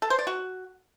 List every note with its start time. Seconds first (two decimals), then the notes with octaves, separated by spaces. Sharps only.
0.02 A4
0.10 C5
0.19 D5
0.27 F#4